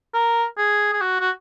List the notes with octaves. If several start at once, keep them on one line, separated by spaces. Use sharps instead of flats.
A#4
G#4
G#4
F#4
F#4